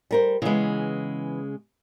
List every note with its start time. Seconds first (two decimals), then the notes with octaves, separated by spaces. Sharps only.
0.11 G3 A#4 C5
0.42 C#3 E3 G#3 B3